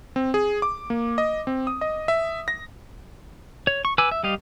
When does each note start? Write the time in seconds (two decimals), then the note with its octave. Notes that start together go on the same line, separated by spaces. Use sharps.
0.16 C4
0.34 G#4
0.62 D6
0.90 A#3
1.18 D#5
1.47 C4
1.67 D#6
1.81 D#5
2.08 E5
2.48 A#6
3.67 C#5
3.85 C#6
3.98 B4 G#5 D6 E6
4.11 E5
4.23 G3 G4 D#5 F5